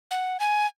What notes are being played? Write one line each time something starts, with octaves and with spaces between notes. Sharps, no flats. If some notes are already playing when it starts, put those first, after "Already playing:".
F#5
G#5